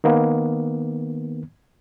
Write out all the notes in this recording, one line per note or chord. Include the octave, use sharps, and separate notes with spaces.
D#3 A#3 B3